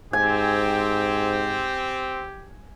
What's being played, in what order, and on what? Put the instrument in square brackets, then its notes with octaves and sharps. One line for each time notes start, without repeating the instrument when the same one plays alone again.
[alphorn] G#2 [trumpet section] C4 [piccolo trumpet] G4 [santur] G#5